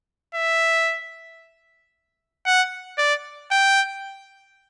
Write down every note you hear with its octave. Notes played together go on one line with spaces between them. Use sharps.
E5
F#5
D5
G5